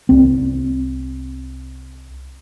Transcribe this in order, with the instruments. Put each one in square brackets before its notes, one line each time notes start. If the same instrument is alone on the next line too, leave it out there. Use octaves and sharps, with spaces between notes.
[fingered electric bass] C2 C4